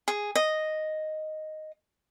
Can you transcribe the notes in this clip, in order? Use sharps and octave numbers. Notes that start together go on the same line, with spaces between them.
G#4
D#5